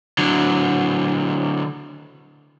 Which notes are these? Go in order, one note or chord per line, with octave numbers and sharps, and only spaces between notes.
D3 F#3